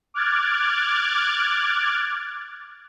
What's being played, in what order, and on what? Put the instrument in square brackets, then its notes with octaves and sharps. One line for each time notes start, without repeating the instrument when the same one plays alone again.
[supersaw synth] D6 F6 F#6 G#6 A6